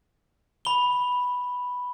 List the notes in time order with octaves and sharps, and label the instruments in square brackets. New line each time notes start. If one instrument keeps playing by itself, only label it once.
[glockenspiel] B5 G7